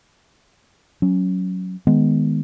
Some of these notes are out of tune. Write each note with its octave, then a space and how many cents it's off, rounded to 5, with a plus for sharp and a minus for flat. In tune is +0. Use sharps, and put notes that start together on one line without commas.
F#3 +0 C#4 +0
D#3 +0 G#3 +0 B3 +0